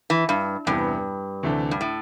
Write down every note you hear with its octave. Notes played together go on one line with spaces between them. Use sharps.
E3
G2
E2 G2 C3 E3 B3 E4
D2 C3 E3 A3 D4
G2
A2